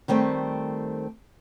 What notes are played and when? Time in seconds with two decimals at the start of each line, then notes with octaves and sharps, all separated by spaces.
0.08 D#3 G3 A3 C4